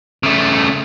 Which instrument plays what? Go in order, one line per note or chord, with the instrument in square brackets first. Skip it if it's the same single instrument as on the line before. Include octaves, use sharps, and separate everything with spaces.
[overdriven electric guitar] C#3 A3